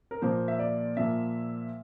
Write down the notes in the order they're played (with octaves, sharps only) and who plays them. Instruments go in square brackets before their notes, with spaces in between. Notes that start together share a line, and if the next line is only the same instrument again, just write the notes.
[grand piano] A#4
A#2 F3 A#3 C5
E5
D5
A#2 F3 A#3 E5